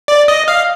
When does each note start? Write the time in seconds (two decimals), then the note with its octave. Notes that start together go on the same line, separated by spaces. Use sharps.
0.08 D5
0.28 D#5
0.48 F5